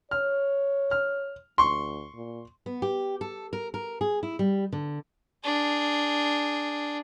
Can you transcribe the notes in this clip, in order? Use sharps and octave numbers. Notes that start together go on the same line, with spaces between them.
C#5 F6
F6
D2 C6 C#6
A#2
B3
G4
A4
A#4
A#4
G#4
E4
G3
D3
D4 G#4